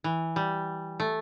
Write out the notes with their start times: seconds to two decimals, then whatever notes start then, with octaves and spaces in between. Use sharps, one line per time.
0.04 E3
0.36 G3
1.00 A3